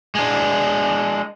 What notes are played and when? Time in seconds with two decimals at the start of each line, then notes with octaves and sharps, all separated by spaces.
0.15 G#3 D4